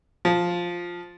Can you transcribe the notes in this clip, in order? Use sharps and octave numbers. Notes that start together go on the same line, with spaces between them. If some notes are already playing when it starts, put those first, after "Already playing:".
F3